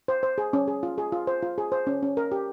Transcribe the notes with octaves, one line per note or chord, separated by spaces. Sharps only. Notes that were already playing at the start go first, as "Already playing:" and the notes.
C5
C5
G#4
C#4
G#4
F4
G#4
F4
C5
F4
G#4
C5
C#4
C#4
A#4
G4